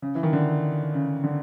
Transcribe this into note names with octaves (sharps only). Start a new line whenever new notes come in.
C#3
E3
D#3
D3
C#3
D3